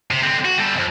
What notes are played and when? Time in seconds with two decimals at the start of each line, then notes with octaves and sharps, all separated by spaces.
0.11 C3
0.24 D3 C4
0.45 F#4
0.58 G3 A4
0.74 B1 F2